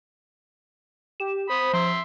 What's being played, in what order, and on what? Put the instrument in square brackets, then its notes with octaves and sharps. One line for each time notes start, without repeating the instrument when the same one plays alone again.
[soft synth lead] G4 [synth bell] E7
[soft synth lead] C5 [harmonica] B5 D#6
[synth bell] F3 [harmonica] E5 C6